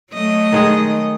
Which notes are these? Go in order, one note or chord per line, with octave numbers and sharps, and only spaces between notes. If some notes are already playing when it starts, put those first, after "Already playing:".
F#3 A3 D#5
D#3 G#3 G#4